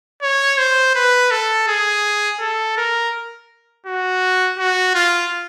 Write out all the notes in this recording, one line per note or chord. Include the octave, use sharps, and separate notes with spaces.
C#5
C5
B4
A4
G#4
A4
A#4
F#4
F#4
F4